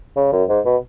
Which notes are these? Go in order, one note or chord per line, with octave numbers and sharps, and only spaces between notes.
C#3
F#2
G#2
B2